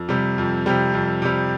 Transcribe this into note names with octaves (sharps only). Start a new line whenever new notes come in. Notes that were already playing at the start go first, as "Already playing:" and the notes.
Already playing: F2
C3 G3
F2
C3 G3
F2
C3 G3